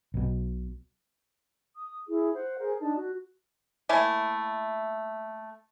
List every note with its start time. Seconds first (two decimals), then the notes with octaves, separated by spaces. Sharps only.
0.14 B1 B2
1.77 D#6
2.08 E4 G#4
2.34 C5 F#5
2.59 G#4 A#4 C5
2.80 D4 D#4 A5
2.95 F#4
3.89 A3 A#3 E4 G#5